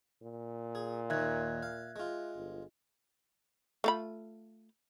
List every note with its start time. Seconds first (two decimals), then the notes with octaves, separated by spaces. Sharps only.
0.22 A#2
0.75 G#4
1.10 D#2 D#3 E5 F#6 G#6
1.63 F5
1.96 G#3 F4
2.36 G1
3.84 A3 F4 B5